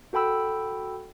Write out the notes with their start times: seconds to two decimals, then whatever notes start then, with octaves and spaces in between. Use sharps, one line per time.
0.13 F#4 A4 G5 B5 E6